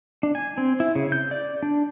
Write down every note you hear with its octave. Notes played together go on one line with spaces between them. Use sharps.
D4
G#5
C4
E4
C#3
G6
D5
D4